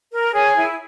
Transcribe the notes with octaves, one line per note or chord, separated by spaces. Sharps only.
A#4
G#4 C#5 G#5
E4